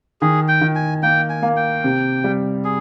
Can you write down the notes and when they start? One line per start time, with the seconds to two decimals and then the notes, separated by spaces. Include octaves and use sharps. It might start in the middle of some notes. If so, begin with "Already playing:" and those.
0.21 D#3 G#4
0.48 G5
0.61 D#3
0.75 G#5
1.03 A#3 G5
1.29 G#5
1.42 A#3
1.56 G5
1.84 C3
2.24 G3
2.64 G#4